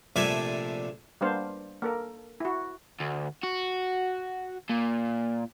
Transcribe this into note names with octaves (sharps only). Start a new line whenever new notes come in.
A#1 C3 A3 D5 E5 G#5
G3 A#3 B3 D4 C5 F5
A#3 A4 A#4
E4 F#4
D2
F#4
A#2